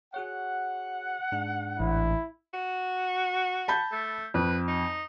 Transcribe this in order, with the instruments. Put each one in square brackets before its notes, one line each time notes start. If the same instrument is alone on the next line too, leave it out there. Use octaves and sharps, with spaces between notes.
[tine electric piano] F#4 G#4 C#5 [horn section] F#5
[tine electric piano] G#2 D4 G#4
[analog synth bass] A1 [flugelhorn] E4
[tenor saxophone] F#4
[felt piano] A5 B5 G6
[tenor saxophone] A3
[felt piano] F2 [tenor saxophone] B4
[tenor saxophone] D#4